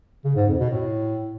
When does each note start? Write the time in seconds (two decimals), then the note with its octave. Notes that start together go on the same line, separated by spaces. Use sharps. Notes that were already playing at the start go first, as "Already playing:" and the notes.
0.25 C#3
0.36 G#2
0.48 F2
0.59 B2
0.71 A2